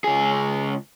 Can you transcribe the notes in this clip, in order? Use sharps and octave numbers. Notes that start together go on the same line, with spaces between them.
C#2 G#4